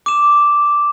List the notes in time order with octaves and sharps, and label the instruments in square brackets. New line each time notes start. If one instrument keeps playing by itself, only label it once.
[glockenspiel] D6 E7